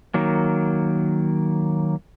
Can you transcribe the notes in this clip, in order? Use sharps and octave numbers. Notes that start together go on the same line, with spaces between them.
D#3 F#3 A#3